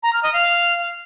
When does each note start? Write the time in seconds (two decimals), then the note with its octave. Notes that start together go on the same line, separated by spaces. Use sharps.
0.03 A#5
0.13 F6
0.23 D#5
0.33 F5